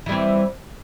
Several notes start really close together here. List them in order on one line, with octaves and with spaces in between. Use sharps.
E3 G3 C4